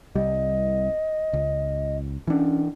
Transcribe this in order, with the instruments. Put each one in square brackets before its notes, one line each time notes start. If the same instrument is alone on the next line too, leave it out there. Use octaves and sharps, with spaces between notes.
[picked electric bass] C2 G3 [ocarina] D#5
[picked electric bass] C#2
[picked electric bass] E3 D4 [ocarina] C#4